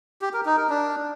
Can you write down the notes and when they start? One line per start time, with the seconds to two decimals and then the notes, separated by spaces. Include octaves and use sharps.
0.22 G4
0.34 A#4
0.46 D#4
0.57 A#4
0.69 D4